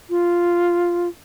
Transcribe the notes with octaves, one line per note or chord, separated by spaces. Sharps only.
F4